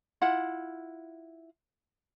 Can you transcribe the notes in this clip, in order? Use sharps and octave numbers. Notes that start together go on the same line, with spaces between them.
E4 F4 F#5